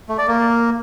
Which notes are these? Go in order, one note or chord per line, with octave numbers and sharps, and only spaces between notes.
A3
D5
A#3